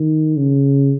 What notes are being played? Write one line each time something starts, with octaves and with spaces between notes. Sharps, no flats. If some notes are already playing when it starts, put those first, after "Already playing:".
Already playing: D#3
C#3